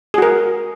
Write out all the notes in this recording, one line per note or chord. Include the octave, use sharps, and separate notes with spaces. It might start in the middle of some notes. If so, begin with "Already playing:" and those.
F#4 G#4 A#4